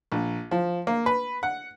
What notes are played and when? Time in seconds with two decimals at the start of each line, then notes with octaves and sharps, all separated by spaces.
0.12 A#1
0.51 F3
0.87 A#3
1.06 B4
1.43 F#5